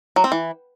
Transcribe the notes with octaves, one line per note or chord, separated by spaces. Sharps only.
F#3
C4
E3